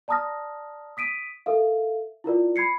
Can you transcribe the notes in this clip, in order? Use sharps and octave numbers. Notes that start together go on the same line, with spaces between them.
D5 A5 A#5 D#6 F6 A#6
D#6 B6 D7 D#7
A4 A#4 E5 F5
E4 F4 A#4 D5
B5 G#6 C7 C#7